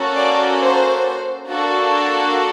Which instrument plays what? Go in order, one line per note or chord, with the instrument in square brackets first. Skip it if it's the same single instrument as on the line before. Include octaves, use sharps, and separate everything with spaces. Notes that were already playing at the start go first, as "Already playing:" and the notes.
Already playing: [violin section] A#3 C#4 F#4 A4
D5
C5
A#3 D4 F#4 A4